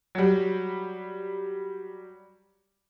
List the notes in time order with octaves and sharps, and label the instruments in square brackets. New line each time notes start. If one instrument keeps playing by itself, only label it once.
[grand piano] F#3 G3